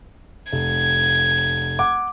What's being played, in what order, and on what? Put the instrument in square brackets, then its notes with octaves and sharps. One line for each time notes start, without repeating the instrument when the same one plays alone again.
[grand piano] F1 [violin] G#6
[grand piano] F#5 D6